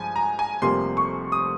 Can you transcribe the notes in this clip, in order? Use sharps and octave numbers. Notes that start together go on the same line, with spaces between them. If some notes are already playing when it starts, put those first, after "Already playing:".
Already playing: G2 F3 G#3 G#5
A#5
G#5
F1 F2 C3 G3 A#3 C6
C#6
D#6